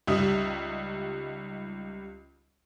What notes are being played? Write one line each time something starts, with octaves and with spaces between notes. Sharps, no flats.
C#2 G3 D#4 E5 D#6